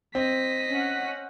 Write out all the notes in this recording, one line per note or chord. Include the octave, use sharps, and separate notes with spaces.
C4 D#5 B6
C#4 F#5